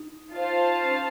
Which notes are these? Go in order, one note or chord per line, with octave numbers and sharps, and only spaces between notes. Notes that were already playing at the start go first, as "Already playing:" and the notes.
Already playing: D#4
F4 C5 F5 A5
C#4
D#4